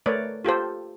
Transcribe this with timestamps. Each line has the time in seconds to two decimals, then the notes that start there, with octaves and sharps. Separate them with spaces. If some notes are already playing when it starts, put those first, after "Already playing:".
0.06 A3 A#4 B4 C#5 D5
0.45 F4 G4 A4 C5